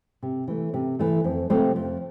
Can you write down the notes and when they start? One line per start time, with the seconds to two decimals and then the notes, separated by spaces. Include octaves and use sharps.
0.23 C3
0.48 E3 A3
0.74 C3
0.99 E3 A3
1.24 F2
1.50 C3 F3 A3 C4
1.76 F2